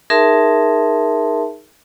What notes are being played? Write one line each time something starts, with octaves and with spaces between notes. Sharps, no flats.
D#4 G#4 A#4 E5 A5 C6